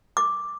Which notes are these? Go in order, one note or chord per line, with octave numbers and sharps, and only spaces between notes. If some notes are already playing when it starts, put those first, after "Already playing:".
D6